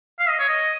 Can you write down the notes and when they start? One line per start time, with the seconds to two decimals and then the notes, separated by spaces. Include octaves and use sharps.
0.19 F5
0.29 D#5
0.39 C#5
0.49 D#5